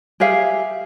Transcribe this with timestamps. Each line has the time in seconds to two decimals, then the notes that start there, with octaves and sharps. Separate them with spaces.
0.20 G4 G#4 E5 F5